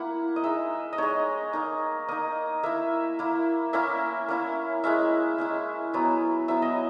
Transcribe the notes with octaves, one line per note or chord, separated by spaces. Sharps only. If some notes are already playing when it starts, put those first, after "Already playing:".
Already playing: A#3 E4 F#5
D#5
G#3 D#4 E5
D#5
G#3 D#4 C#5
A#3 D#4
A#3 D#4 D#5
A#3 E4 E5
A#3 E4
A#3 C#4 E4 E5
A#3 C#4 E4
G#3 C#4 E4 E5
G#3 C#4 E4
F#3 B3 E4
F#3 B3 E4 E5
D#5